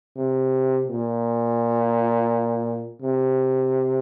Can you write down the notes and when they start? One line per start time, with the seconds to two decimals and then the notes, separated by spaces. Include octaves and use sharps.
0.16 C3
0.88 A#2
3.02 C3